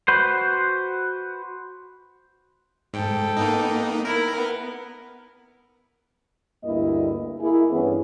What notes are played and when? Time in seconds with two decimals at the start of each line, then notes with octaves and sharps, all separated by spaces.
0.08 F#4 B4 C5
2.94 G#2 A4 G5
3.37 A#3 B3 D#4
4.05 E4 A#4
4.36 B3
6.64 D2 G2 A#3 E4 D#5
7.40 A#3 E4 G#4
7.71 G2 E3 B3 C#4 E4 G#4